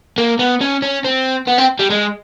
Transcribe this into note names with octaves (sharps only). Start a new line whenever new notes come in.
A#3
B3
C#4
C#4
C4
B3
C4
G3
G#3